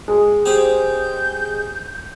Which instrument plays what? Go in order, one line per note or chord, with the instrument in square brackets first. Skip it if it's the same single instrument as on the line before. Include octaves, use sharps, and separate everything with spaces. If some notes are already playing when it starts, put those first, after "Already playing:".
[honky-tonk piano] G#3
[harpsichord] C4 G4 G#4 [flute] G6